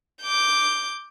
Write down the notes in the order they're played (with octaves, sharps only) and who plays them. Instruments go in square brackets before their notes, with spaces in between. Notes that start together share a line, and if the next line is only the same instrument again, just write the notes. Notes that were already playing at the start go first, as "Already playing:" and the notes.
[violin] D6 G6